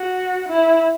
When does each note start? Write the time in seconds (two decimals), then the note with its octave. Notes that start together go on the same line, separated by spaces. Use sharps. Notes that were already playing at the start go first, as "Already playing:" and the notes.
Already playing: F#4
0.48 E4